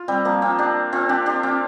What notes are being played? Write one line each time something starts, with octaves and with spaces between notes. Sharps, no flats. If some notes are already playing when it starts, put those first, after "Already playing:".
Already playing: F4
G3 C4
F3 A#3
C4 F4
D4 G4
C4 F4
D4 G4
D4 G4
C4 F4